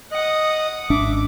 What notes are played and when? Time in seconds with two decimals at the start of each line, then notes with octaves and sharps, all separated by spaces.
0.11 D#5 F#5 D#6
0.90 G#1 C#4 D4 E5 D6